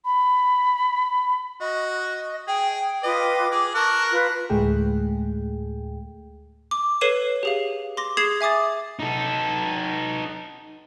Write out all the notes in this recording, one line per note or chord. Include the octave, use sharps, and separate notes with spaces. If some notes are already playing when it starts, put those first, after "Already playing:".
B5
F#4 D#5
G#4 G5
F4 B4 D#5 D6
G#4 D6
A#4 A5 C#6 F#6
F4 B4
D2 A2 G#3 A3 G#4 G5
D6
A4 B4 C#5 C7 D#7 E7
G4 G#4 F5
C6 D6 A#6
G#4 D#6 G#6 C7 E7 F#7
E5 G#5 D6 D#6 A6
D#4 A4